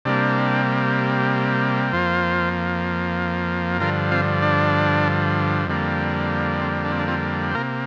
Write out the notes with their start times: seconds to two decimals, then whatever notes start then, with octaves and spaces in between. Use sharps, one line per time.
0.05 C3 G3 A#3 D4
1.93 F2 F3 A#3 C4 F4
3.80 G2 D3 F3 F4 A#4
4.12 C4 F4
4.42 D4
5.68 F2 D3 G3 A#3
6.61 C4
6.84 D4
6.92 C4
6.99 D4
7.08 C4 F4
7.51 C5
7.55 C3 A#3 F4 A#4